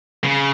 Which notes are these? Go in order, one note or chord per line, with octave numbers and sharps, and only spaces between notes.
C#3